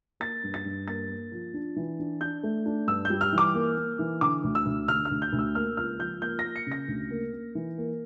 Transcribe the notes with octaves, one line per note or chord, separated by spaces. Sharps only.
A#3 A6
G2
A6
G2
A#3 A6
A#3
F3
D4
E3
D4
D4 G6
A3
D4
G2 E6
G6
G3
F6
E3
D6
A#3
A#3
E3
D3 D6
D2
E6
D2
D3 F6
F6
D2
G6
D2
E6
A#3 F6
C#2 F6
F3 G6
A#3 G6
A#6
A#3
C#7
C#3
A#6
D2
A#3
A#3
E3
A#3